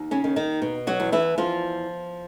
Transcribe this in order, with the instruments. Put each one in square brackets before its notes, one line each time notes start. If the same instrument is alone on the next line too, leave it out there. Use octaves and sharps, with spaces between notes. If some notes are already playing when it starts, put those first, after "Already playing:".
Already playing: [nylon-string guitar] D#2
C#3 C#4
D#3
D#3 D#4
B2
F#3 F#4
E2
E3 E4
E2 F3 F4